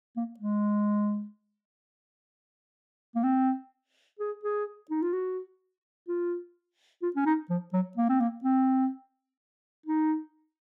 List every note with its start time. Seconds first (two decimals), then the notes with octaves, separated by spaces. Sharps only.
0.16 A#3
0.39 G#3
3.15 A#3
3.23 C4
4.19 G#4
4.43 G#4
4.90 D#4
5.02 F4
5.13 F#4
6.08 F4
7.02 F4
7.16 C#4
7.26 D#4
7.50 F3
7.73 F#3
7.97 A#3
8.09 C4
8.20 A#3
8.44 C4
9.86 D#4